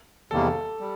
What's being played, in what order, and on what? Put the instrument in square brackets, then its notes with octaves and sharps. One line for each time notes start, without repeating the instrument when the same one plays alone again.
[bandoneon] E2 C3 D#3 G3 A#3 [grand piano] A4
[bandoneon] G3